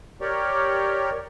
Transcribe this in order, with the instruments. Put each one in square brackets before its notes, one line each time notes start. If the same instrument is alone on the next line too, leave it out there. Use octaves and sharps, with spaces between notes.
[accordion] G4 A#4 C#5 D5